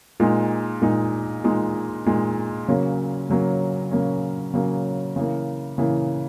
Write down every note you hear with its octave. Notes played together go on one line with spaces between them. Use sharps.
A#2 G#3 D#4
A#2 G#3 D#4
A#2 G#3 D#4
A#2 G#3 D#4
C#3 F#3 A#3 C#4
C#3 F#3 A#3 C#4
C#3 F#3 A#3 C#4
C#3 F#3 A#3 C#4
C#3 E3 A#3
C#3 E3 A#3